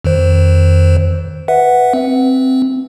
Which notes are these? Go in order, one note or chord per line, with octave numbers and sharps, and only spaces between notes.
F2 D#3 C5
B4 E5 F#5
C4